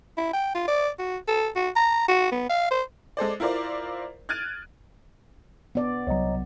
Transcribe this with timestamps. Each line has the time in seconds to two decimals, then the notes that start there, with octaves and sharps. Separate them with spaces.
0.18 E4
0.34 G5
0.55 F4
0.68 D5
0.99 F#4
1.28 A4
1.56 F#4
1.76 A#5
2.08 F#4
2.32 B3
2.49 F5
2.71 C5
3.17 G#3 A4 C5 D5
3.40 E4 F4 A#4 C5 D5
4.29 F6 F#6 G#6 A6 D7 D#7
5.75 B3 D5
6.07 C2 F#3 C#5 D#5 A#5